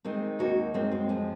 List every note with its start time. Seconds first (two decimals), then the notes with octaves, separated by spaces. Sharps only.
0.05 D#3 G#3 C4
0.39 D#2 D#4 F#4
0.74 F#2 G#3 C4
0.91 G#3 C4
1.09 F3 G#3